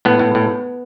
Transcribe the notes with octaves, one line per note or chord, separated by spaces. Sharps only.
A2 B3
A2
A2